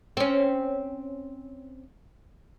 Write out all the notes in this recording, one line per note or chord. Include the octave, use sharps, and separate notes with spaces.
C4 C#4